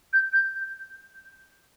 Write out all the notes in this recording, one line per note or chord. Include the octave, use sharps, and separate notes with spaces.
G6
G6